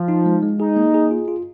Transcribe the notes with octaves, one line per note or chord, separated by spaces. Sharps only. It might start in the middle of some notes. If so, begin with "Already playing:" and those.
Already playing: F3
D#4
G#3
G#3
D#4 G#4
A#3
G#4
F4
F4